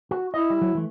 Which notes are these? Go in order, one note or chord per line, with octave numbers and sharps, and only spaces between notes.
F#4
E4 D#5
G3
F#3
E3 A3